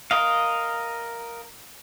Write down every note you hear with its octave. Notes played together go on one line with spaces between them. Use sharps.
A#4 D#5 F5